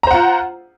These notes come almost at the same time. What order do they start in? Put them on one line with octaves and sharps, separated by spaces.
A#5 C5 F#5 F4